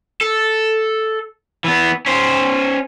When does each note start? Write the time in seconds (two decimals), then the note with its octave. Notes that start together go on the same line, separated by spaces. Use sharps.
0.21 A4
1.64 E3 B3
2.06 C#4 C5